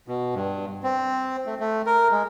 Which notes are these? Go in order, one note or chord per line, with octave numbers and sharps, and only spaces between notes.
B2
G2
C4
A3
A3
A#4
G#3